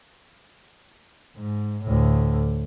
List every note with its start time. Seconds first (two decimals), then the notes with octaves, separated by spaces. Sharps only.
1.37 G#2
1.84 D2 A2